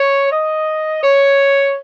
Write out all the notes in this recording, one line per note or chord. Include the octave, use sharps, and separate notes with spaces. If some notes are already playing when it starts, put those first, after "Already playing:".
Already playing: C#5
D#5
C#5